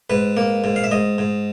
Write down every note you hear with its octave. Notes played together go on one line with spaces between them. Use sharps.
G#2 B4
A#3
G#2
F5
E5
G#2 D#5
G#2